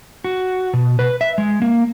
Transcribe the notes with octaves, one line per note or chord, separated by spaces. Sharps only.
F#4
B2
B4
E5
G#3
A#3